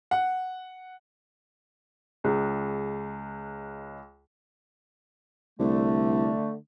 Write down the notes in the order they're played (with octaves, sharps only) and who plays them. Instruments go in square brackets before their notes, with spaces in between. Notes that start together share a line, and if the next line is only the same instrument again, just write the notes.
[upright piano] F#5
C#2 G#3
[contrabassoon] C2 [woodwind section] D3 A3